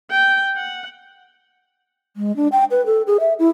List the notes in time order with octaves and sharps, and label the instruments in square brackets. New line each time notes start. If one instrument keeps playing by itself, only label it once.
[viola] G5
F#5
[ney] G#3
D4
G5
B4
A4
G#4
E5
E4